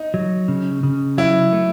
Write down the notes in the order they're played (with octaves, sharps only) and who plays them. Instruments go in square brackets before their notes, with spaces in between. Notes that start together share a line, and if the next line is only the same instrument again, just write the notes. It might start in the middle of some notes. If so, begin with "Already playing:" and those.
Already playing: [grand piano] D#4
[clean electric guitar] F#3
C#3
C#3
[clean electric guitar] F#3 [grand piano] E4
[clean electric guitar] A3